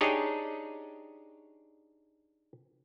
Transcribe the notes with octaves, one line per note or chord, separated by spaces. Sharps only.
D4 D#4 G4 G#4 C#5 D#5